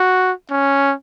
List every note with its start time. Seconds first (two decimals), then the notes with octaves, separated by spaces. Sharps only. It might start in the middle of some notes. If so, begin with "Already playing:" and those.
Already playing: F#4
0.50 C#4